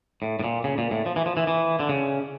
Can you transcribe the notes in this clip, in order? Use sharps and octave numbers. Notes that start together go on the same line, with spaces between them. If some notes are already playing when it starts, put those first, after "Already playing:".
A2
A2
A#2
C#3
A#2
A2
F3
E3
F3
E3
E3
D3
C#3